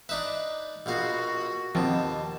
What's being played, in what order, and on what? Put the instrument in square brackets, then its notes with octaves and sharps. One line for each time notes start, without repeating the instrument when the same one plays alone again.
[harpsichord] D4 D#4 B4 [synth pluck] E5
[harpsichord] A#1 B2 F5 [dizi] F#4
[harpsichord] D#2 B2 [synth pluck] D#3 F3 C4 [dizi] A5